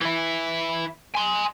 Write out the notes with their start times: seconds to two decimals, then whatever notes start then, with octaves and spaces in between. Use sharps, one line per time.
0.01 E3 E4
1.15 G#5 C6